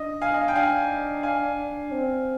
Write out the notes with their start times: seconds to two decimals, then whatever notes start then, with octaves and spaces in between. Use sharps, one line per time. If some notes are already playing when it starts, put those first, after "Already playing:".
Already playing: D4 D#5
0.22 F5 G#5
0.34 D#5
0.42 F5
0.48 G5
0.55 D4 F5 G#5
1.23 F5 G#5
1.92 C4